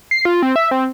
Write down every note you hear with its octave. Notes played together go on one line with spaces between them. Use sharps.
C7
F4
C4
E5
C4